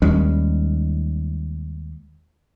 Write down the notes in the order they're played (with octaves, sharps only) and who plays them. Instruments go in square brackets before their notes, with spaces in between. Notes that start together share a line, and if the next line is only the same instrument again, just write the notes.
[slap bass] D#2 G3 G#3 C#4